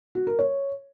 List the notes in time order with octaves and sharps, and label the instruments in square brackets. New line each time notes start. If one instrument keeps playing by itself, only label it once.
[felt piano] F#4
A#4
C#5